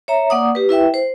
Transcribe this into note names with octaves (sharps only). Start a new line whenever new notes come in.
C#5 E5 A#5
A#3 D5 F#5 D6 D#6
G4 B4
E4 B4 E5 G5
C5